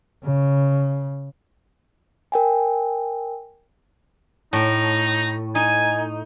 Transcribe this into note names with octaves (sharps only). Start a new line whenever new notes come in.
C#3
A#4 G5 G#5
A2 D#4
D#4 G#5